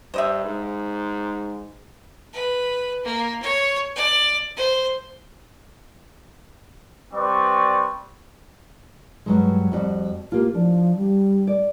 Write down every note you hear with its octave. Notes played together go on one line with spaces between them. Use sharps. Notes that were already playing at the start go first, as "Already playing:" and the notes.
G2 C5 D#5 E5
G#2
B4
A#3
C#5
D5
C5
G3 C4 B4 D5 C#6
G2 F#3 G#3
F2 G3 F#4
A#3 F4 G4
F3 D4
G3
D5